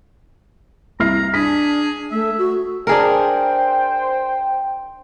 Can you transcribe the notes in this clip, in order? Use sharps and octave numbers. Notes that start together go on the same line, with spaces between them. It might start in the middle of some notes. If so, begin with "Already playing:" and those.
C2 A#5 F6 C7
D4 G#4 B6
A3 E5
F#4
D4 G#4 A#4 C5 G5